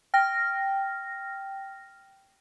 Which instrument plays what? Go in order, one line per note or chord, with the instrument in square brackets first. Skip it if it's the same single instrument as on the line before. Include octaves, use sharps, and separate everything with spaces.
[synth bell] G5 F6 A#6